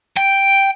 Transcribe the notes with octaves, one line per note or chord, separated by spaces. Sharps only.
G5